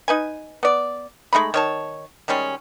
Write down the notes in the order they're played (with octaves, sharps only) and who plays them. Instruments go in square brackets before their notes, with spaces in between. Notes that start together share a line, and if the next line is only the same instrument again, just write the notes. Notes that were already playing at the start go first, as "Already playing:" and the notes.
[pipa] D#4 B4 G#5
B3 D5
G#3 A3 D#4 B5
D#3 C#5 A5
D#3 G3 G#3 C#4